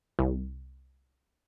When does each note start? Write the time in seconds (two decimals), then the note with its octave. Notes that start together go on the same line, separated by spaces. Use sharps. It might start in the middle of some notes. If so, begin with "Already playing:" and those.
0.19 C2